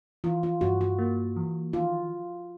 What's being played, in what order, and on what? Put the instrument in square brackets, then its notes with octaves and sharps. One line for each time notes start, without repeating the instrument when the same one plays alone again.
[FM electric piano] E3 [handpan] F4
[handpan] F4
[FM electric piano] G2 [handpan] F#4
[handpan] F#4
[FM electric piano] A#3
E3
[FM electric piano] D#3 [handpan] F4